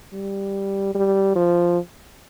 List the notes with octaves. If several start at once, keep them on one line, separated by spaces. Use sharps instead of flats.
G3
G3
F3